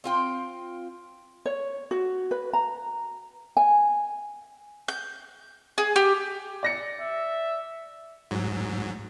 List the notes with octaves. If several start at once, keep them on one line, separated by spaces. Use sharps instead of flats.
C4 F4 G5
C#5
F#4
B4
A#5
G#5
G6
G#4
G4
D5 A#6 C#7
E5
G#2 F#3